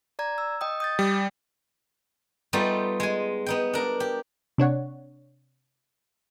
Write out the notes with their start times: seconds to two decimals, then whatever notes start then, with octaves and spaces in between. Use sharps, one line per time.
0.19 D5 A#5 G#6
0.38 E6
0.61 D#5 G5 D#6
0.80 D#6 G6 A6
0.99 G3
2.53 G3 A3 B3 D#4 F4
3.00 G#3 G#5
3.46 B3 D#4 G5
3.74 D4 A#4
4.00 G4
4.58 C3 D4 C#5 F#5